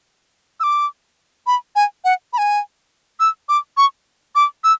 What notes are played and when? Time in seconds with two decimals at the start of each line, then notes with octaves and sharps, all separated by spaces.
0.60 E6
0.63 D6
1.47 B5
1.76 G#5
2.04 F#5
2.33 B5
2.38 G#5
3.20 E6
3.49 D6
3.77 C#6
4.35 D6
4.64 E6